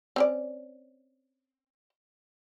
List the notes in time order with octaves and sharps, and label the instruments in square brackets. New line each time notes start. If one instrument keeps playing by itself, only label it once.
[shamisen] C4 C#4 D5